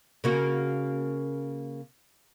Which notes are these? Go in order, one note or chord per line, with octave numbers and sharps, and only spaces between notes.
C#3 A#3 F#4